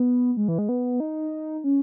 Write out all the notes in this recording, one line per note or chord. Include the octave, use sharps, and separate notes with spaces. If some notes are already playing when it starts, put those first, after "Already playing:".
Already playing: B3
G#3
E3
G#3
B3
D#4
C#4